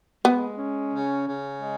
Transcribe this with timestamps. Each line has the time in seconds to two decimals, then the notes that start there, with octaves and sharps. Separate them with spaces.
0.25 G#3 B3
0.58 C#4
0.92 C#3
1.26 C#3
1.60 G#3